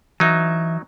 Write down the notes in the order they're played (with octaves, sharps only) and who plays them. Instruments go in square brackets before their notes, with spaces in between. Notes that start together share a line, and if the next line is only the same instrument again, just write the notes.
[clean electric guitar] E3 E5 [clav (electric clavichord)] F#3 D#4